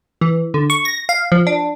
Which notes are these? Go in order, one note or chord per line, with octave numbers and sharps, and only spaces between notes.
E3
D3
C#6
A#6
F5
F3
D4